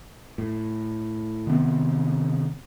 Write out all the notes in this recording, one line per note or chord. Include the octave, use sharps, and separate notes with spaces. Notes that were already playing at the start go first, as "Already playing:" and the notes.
A2
C3 D#3 B3 C4